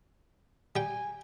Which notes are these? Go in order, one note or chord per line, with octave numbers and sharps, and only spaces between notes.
G3 G5 G#5